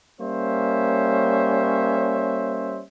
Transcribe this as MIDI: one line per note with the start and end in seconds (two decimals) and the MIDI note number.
0.21 2.82 55
0.21 2.82 58
0.21 2.82 61
0.21 2.82 72
0.21 2.82 73
0.21 2.82 76